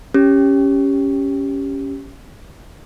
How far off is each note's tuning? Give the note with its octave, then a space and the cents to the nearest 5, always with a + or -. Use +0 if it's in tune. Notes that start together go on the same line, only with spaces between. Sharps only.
C#4 +0 G4 +0